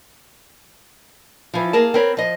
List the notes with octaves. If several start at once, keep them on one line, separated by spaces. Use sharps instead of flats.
E3 F3
A#3 G#4 A#4 A5
C4 A#4 B4 C#5
F3 D#5